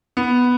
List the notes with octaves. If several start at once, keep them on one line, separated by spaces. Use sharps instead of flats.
B3